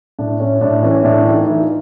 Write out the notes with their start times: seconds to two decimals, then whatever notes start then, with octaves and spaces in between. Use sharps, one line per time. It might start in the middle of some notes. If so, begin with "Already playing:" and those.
0.19 A2 D4
0.40 A2 C#4
0.61 A2 D4
0.83 E3 C#4
1.04 A2 D4
1.25 E3
1.32 D#4
1.47 E3
1.61 F4